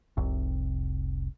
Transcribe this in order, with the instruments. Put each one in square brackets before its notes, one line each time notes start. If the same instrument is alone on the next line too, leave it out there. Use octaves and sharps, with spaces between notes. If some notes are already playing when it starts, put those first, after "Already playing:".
[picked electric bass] F1 C2 C3